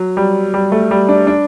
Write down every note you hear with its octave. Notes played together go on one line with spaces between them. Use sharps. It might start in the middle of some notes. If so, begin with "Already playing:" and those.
Already playing: F#3
G3
G3
A3
G3
D4
D4